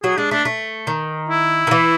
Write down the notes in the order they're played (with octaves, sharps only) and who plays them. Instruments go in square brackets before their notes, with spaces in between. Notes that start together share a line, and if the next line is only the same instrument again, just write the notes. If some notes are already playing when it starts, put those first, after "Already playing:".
[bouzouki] F#3 [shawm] G#4
[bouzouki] G#3 [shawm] D4
[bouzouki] A3 [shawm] D4
[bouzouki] A3
D#3
[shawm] E4
[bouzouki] D#3
E3